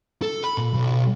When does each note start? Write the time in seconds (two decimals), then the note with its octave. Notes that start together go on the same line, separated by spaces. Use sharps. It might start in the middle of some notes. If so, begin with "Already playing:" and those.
0.22 A4
0.44 B5
0.58 A#2
0.74 B1